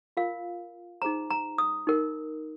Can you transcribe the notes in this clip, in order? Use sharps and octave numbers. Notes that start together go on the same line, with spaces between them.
F4 A#4 F5
D#4 G#4 C5 A#5
A#5
D#6
D#4 A#4